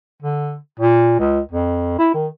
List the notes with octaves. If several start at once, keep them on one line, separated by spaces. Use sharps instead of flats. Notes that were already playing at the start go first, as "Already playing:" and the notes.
D3
A#2
C#2
F2
E4
D#3